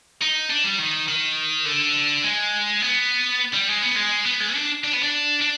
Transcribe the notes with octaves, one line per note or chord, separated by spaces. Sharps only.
D#4
D4
G3
D#3
D#3
D3
G#3
B3
G3
G#3
B3
G#3
B3
G#3
D4
D4
B3
D4
D4